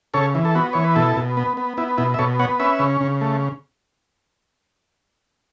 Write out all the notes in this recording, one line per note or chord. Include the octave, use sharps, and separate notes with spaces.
C#3 A4 C#5
E3
A4
B3 F#4
E3 C#5
B4
B2 E4 A4
B2
B3
B3
B3 E4
B2 E4
E5
B2 A4 C#5
B3 C#5 F#5
C#4 B4 E5
C#3
C#3
A3